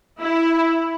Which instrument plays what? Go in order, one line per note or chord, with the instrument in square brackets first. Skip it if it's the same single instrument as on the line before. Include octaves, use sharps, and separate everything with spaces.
[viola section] E4